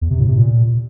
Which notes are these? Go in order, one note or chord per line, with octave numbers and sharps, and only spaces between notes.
E2
C3
A2
C3
A#2